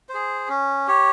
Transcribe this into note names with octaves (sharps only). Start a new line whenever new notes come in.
G#4 C5
C#4
G4 C#5